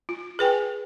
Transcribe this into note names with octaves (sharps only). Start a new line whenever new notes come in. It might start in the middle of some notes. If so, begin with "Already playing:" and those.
F4
G#4 B4 G5 G#5